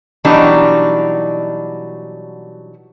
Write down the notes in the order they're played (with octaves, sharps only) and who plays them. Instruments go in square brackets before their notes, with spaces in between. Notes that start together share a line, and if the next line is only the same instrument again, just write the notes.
[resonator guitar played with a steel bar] B2 E3 F#3 G3 D4 D#4